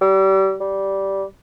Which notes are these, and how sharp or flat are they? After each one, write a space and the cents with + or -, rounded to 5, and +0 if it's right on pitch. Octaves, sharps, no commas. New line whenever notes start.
G3 -30
G3 -10